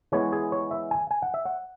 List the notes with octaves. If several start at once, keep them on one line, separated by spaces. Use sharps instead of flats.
E3 G#3 B3 C#5
G#4
C#5
E5
G#5
G#5
F#5
E5
F#5